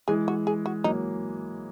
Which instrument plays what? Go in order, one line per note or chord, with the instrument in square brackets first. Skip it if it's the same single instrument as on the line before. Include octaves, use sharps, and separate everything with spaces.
[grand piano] E3 G#3 [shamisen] G#4
[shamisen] F#4
G#4
F#4
[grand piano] F#3 A#3 [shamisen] D#4